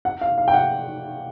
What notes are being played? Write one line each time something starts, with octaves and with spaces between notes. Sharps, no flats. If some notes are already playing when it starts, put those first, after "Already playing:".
F#5
F5
F5
G5
F#5